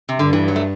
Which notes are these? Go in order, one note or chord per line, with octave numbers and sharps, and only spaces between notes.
C3
G2 D3
E3
F#3
A3